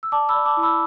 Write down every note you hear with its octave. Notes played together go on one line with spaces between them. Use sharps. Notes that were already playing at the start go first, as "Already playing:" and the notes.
E6
D5 A5 D6
B5 E6
D5
A5 D6
E4
B5 E6